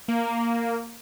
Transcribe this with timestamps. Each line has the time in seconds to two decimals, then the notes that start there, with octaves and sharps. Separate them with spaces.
0.08 A#3